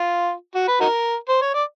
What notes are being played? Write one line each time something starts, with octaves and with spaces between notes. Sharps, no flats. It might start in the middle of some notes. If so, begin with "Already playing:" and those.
Already playing: F4
F#4
B4
D#4 F#4 A#4
C5
C#5
D5